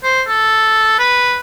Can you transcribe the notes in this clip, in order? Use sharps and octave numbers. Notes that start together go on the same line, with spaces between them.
C5
A4
B4